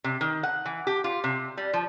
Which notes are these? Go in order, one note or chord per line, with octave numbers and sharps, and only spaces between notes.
C3
D#3
F#5
E3
G4
F4
C3
G3
F3